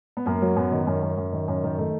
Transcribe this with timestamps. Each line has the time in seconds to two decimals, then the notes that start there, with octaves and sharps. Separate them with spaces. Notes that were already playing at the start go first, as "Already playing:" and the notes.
0.17 B3
0.26 F#2 A#3
0.42 F#3
0.56 F#2 B3
0.72 D#3
0.87 F#2 C#4
1.02 F#2
1.17 F#2
1.33 D#3
1.48 F#2 C#4
1.64 D#3
1.78 D#3 A3